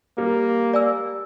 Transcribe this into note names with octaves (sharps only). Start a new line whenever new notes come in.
G3 A#3
D5 G#5 E6